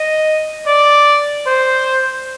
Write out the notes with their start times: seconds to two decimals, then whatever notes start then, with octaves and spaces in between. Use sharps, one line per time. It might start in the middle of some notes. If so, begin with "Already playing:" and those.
Already playing: D#5
0.66 D5
1.46 C5